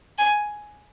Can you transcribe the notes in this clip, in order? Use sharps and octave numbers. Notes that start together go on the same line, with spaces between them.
G#5